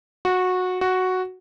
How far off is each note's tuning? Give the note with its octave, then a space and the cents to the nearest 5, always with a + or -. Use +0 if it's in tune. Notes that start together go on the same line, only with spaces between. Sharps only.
F#4 -15
F#4 +0